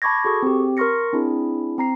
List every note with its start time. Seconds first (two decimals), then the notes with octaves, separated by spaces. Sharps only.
0.02 A5 B5 C#6 D6 G#6 A#6
0.24 F#4 G#4 A4 C#6 D#6
0.43 C4 G4
0.77 A#4 C6 C#6 F6 A#6 C#7
1.13 C4 D4 E4 G#4
1.78 C4 A#5 C7